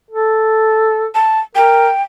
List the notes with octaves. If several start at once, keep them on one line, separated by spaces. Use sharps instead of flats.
A4
A5
A#4 G5